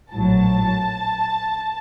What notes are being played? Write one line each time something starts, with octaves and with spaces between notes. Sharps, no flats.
A#1 A2 F#3 A5